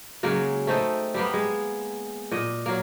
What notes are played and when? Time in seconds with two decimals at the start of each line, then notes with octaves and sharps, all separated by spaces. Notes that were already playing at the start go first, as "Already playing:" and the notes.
0.23 C#3 F#3 G#3 A#3
0.67 A3 C4 D#4 A4
1.14 G3 A#3 B3
1.34 G#3
2.32 A#2 D#5
2.66 F#3 A#3